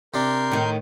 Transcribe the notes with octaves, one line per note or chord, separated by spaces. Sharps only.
C3 D4 A#4 C6 G6
A2 D#3